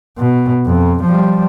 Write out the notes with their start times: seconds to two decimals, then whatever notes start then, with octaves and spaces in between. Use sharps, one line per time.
0.18 B2
0.66 F2
1.05 F3 G3